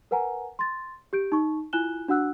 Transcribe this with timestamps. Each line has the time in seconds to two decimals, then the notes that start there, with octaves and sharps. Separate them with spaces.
0.11 A#4 B4 F#5 G#5 A#5
0.59 C6 A6
1.13 G4 G6 D7
1.32 D#4 C#6
1.73 E4 F4 G#5 F#6 E7 G7
2.08 D4 F#4 F#5 E6 F#6